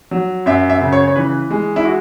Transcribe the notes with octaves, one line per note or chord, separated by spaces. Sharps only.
F#3
F#2 E5
E5
C#3
C#5
C#5
E3 B4
G#3
E4
F#4